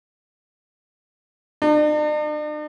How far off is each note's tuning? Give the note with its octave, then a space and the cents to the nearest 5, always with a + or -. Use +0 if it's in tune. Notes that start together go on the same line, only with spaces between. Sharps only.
D4 +45